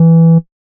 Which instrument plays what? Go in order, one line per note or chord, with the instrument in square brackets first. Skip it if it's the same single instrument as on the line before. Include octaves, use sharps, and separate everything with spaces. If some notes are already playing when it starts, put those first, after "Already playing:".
Already playing: [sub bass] E3